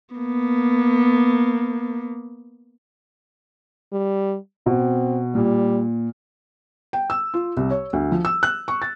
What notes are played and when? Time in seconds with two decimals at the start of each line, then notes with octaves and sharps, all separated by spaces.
0.16 A#3 B3
3.92 G3
4.66 B2 C4
5.35 A#2 G3
6.93 G5
7.10 E6
7.34 F4
7.57 C2
7.71 C#5
7.93 D2
8.12 F3
8.25 E6
8.43 F#6
8.68 C#6
8.82 A6